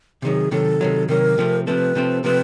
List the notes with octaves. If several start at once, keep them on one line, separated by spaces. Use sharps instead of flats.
C3 D#3 F#3 G#4
C3 D#3 F#3 A4
C3 D#3 F#3
C3 D#3 F#3 A#4
C3 F3 A3 C4
C3 F3 A3 C4 B4
C3 F3 A3 C4
C3 F3 A3 C4 B4